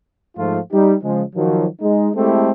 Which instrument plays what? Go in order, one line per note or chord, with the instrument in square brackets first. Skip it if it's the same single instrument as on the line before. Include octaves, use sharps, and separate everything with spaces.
[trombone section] G#2 F3 A3 F4
G3 D#4 G4
C#3 F3 G#3
D#3 F3 F#3
G#3 D#4
G#3 A3 C4 E4 G4 A4